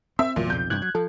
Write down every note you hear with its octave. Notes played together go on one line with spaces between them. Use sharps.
C4 E5
G1 E2 A#2 F#3
B1 F2 C#3 G6
G2 C3 E3 F#6 G#6
F#3
F3 A4